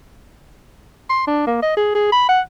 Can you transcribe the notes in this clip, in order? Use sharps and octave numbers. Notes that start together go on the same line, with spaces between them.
C6
D4
A#3
D#5
G#4
G#4
B5
F#5